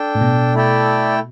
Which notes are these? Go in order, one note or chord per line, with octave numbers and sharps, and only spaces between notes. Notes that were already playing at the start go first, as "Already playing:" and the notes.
Already playing: D4 A4 G5
A2
B2
A3 E4 A4 D5 G5